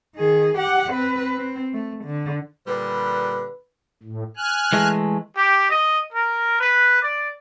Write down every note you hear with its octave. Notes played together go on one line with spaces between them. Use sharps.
D#3 G#4
G4 F#5
C4 B4
C4
A3
D3
A#2 D3 G3 B4
A2
G#5 F6 F#6
E3 G#3 A3
G4
D#5
A#4
B4
D5